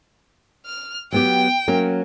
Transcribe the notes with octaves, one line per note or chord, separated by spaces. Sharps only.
F6
F#3 B3 G4 G5
F#3 A#3 C#4